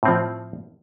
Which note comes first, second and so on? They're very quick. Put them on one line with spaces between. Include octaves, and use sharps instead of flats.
A2 C4 F3